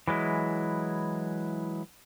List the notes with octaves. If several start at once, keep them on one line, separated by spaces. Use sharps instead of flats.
E3 F#3 G#3 E4